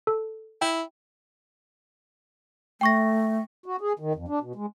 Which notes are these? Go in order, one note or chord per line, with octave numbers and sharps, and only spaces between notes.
A4
E4 G5
A3 G5 C#6 A#6
F#4
G#4
D#3
F2
D4
B2
G#3